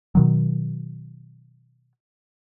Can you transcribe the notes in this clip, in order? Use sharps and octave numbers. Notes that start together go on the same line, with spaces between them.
B2 D#3 F#3